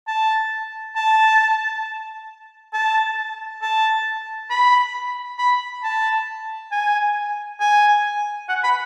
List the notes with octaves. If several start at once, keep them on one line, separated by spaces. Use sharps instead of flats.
A5
A5
A5
A5
B5
B5
A5
G#5
G#5
F#5
B5